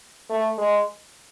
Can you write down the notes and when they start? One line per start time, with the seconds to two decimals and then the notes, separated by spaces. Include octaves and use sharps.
0.30 A3
0.58 G#3